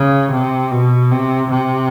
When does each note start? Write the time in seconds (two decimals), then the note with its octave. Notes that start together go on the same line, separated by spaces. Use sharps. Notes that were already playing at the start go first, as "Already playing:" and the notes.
Already playing: C#3
0.32 C3
0.72 B2
1.11 C3
1.51 C3